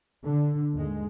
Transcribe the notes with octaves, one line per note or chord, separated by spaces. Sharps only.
D3
D#2 G#2 G#3